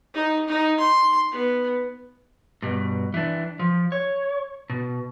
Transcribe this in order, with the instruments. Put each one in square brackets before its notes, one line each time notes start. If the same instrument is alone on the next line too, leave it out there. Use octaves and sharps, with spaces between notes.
[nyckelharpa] D#4
D#4
C6
B3
[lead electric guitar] G2 B2
E3 D4
F3
C#5
B2